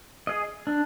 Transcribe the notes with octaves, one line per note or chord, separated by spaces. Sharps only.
G#4 D#5
D4